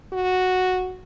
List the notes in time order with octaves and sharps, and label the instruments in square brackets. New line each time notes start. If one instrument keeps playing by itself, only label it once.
[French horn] F#4